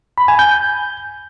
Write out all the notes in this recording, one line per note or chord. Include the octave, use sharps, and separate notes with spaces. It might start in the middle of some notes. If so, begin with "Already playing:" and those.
B5
G#5
G6